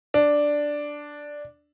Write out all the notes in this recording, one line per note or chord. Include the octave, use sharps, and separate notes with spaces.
D4